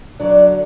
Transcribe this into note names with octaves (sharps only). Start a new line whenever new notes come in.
F#3 D4 D5
D3